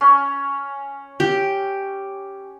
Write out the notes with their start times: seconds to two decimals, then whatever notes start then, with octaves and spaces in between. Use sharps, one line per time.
0.01 C#4
1.20 G4